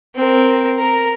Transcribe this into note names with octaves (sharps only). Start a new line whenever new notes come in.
C4 A#4
A#4 A#5